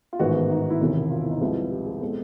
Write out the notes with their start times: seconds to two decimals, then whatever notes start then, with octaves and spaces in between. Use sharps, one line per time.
0.13 F4
0.19 A1 G#2 D#3 G#3 B3 F#4
0.35 G#4
0.50 D#4
0.60 D#4
0.70 E4
0.81 E1 E2 C3 D#3
1.10 F4
1.25 E4
1.31 D#4
1.40 C2 C3 F3 G#3 B3 E4
1.71 G4
1.86 G#4
2.01 B2 G#3 C4 A4